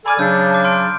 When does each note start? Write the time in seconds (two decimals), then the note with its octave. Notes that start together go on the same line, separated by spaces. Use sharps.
0.06 A4 D5 G#5 B5 D6 F6
0.19 C#3 F#3 D4 E6 G6
0.51 A5 D6
0.64 C6 F6 D7